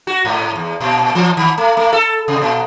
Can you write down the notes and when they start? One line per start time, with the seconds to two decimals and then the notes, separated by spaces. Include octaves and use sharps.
0.07 F#4
0.25 G#2
0.56 E2
0.81 A#2
1.15 E3
1.37 D#3
1.58 A3
1.77 A3
1.93 A4
2.28 C3
2.42 A#2